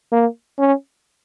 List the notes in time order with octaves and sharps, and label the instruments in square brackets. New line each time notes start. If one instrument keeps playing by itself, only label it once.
[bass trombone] A#3
C#4